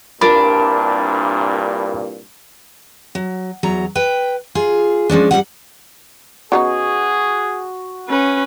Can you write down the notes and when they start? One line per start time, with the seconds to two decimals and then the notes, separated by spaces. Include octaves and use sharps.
0.21 C2 G2 A#2 D4 F4 A#4 A5 B5
3.15 F#3
3.63 E2 F#3 A#5
3.96 B4 G5
4.55 F4 G#4
5.10 F3 G#3 C#4 D4
5.31 G#2 F#3 G3 F#5
6.52 C#3 B3 D#4 F#4 G#4
8.08 C#4 B4